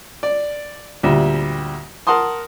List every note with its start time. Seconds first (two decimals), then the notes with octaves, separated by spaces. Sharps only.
0.23 D5
1.03 D2 A#2 G3 E5
2.07 A#4 F#5 A5 C6 D#6